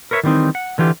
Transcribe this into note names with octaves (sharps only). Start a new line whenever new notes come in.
A#4 B4 C#5 D#5 E5
D#3 E3 G3 C4 D#4
F#5
D3 E3 F4 G4